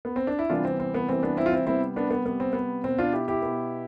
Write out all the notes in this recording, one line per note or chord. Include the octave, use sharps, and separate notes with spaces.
B3
C4
D4
E4
C3 E3 G3 B3 D4 F4
C4
C4
B3
C3 E3 G3 B3 C4
B3 D4
C4 E4
F4
C4 E4
C3 G3 B3 C4 E4
B3 D4
B3
C3 G3 B3
C4
B3
B2 B3 C4
D4 F4
E4 G4
E4 G4
B2 B3